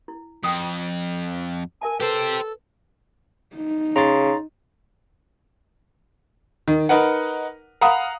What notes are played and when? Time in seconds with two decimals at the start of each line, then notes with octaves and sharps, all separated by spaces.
0.08 E4
0.44 F2 G5 D#6
1.81 A#4 E5 G#5 A5
2.00 G4 A4 B4 C5
3.55 D#4
3.96 C#3 A#5 C6 A6
6.68 D#3
6.89 D#4 A#4 B4 F#5
7.81 F5 F#5 A#5 B5 D#6